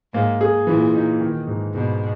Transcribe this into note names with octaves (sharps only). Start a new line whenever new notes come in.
G#2 A#3
G#4
A#2 E3
D#4
D#3
G#2
G#2 B2